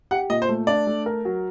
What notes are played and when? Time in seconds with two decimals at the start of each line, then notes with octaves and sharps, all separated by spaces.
0.11 G4 F#5
0.30 A#2 D#5
0.42 C5
0.49 A3
0.67 D4 D5
0.87 A3
1.06 A#4
1.25 F#3